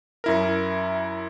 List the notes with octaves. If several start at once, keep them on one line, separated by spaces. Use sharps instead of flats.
F#2 E4 A#4